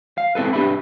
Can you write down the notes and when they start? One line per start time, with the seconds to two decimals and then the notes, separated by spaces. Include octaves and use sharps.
0.18 F5
0.35 C4 E4 A4 B4
0.53 D4 G4 B4 E5 B5